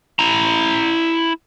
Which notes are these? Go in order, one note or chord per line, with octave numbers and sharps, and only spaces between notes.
E4 A#5